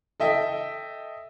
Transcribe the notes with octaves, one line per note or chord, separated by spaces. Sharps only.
A4 D#5 E5 G5